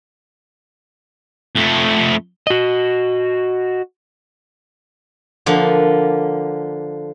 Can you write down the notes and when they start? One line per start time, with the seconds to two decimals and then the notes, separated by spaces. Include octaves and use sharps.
1.56 F2 A3
2.47 F#4 D#5
5.46 D3 F3 A#3